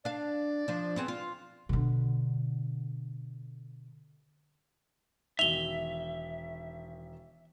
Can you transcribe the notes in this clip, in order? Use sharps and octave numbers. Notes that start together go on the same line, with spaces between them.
D4 D5 F5
F3 D4
B3 C4 G#4
F4
B2 D3
E1 D#3 E5 F7 G7